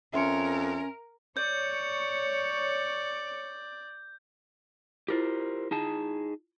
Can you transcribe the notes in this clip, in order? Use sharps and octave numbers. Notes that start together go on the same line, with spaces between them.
F2 C#4 A#4 E5 C6 C#7
C#5 D5 G6
E4 F4 G4 A#4 C5
D#4 G#4 A5